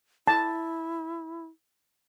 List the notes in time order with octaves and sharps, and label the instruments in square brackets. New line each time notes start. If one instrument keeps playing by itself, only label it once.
[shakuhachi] E4 [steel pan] A5